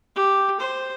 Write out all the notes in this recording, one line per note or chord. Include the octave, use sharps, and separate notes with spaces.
G4
C5